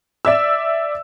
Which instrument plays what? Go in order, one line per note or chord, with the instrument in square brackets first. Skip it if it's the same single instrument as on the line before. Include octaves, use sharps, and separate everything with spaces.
[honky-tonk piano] D5 E5 E6